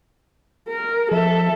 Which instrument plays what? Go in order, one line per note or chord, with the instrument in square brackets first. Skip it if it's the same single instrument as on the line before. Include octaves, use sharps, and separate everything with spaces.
[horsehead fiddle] A#4
[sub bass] F3 [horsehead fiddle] A4 E5